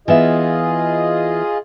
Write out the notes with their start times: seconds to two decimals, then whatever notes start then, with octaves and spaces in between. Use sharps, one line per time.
0.08 E3 B3 F4 G#4 D#5 E5